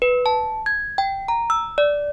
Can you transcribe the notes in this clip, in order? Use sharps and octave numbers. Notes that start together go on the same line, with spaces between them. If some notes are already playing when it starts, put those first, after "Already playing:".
B4
A5
G#6
G5
A#5
E6
D5